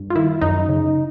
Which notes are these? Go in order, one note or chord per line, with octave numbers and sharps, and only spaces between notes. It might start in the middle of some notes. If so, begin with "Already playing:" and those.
Already playing: G2
F4
D#3 E4
F#2 D#4
C#3